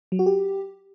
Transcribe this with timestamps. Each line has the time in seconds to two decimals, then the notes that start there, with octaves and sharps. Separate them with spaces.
0.12 F#3
0.19 F#4
0.26 G4